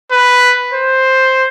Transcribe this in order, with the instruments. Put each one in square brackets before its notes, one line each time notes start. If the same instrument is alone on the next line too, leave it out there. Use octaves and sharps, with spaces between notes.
[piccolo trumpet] B4
C5